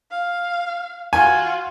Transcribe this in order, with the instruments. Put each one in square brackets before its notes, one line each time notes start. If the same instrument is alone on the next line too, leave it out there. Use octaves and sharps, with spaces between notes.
[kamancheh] F5
[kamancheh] F4 F#4 [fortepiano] G#5